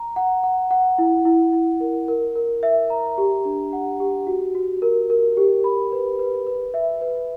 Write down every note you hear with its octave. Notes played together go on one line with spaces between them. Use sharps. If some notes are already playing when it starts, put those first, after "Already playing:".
Already playing: A#5
F#5
F#5
F#5
E4
E4
E4
A#4
A#4
A#4
E5
A#5
G4
D4
F#5
G4
F#4
F#4
A#4
A#4
G4
B5
B4
B4
B4
E5
B4